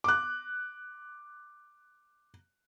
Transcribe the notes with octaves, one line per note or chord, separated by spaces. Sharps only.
D6 F#6